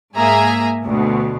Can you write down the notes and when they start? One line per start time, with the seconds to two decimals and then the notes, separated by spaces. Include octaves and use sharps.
0.15 G#2 A#3 G#4 E5 G#5 A#5
0.85 D2 B2